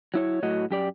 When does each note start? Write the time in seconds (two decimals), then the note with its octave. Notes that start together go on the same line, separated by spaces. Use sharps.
0.14 F#3 E4 C#5
0.43 A2 F#3 F#4 D#5
0.71 F#2 G4 D5